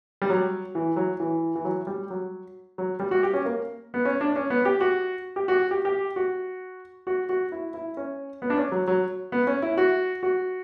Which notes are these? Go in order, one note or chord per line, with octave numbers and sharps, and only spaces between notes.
G3
F#3
E3
F#3
E3
E3
F#3
G3
F#3
F#3
G3
F#4
G4
C#4
A#3
B3
C#4
D4
C#4
B3
G4
F#4
G4
F#4
G4
G4
F#4
F#4
F#4
E4
E4
C#4
B3
D4
C#4
F#3
F#3
B3
C#4
E4
F#4
F#4